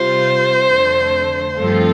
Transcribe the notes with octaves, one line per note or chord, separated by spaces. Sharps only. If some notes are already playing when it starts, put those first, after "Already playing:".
Already playing: C3 G3 F4 C5
F2 D3 A3
G2 F3 A3 C4 F4 A4